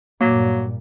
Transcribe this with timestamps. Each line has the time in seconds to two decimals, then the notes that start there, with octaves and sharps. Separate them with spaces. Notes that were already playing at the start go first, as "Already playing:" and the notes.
0.21 G2 A#2 F#3 A#3